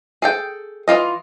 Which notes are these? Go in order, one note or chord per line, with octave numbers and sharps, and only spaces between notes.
G#4 A4 G5
E3 D#4 F4 D#5